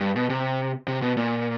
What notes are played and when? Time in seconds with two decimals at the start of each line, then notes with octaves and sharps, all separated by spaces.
0.01 G2
0.16 B2
0.30 C3
0.88 C3
1.02 B2
1.17 A#2